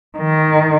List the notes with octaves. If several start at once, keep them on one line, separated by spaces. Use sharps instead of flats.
D#3